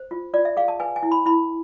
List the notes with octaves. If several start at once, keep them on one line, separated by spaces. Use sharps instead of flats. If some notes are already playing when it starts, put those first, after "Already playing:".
Already playing: C5
F4
F4 D5
E5
G#4 F5
A5
B4 G#5
G#5
E4
B5
E4 B5